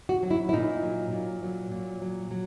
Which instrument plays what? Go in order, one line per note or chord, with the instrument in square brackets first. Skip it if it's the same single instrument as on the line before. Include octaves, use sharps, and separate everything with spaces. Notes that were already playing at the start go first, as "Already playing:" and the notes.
[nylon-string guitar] F#4
F#3
E4
E4
A#2 D#4
F#3
A#2
F#3
A#2
F#3
F#3